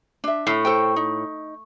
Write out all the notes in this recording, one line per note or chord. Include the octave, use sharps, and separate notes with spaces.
D4 E5
A2
A4 C5 G5
D#4